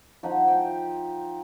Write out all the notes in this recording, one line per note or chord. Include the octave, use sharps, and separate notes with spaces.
F3 D#4 F#5
G5